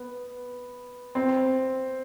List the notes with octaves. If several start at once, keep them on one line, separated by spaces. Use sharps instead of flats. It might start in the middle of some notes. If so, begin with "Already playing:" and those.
Already playing: B3
C4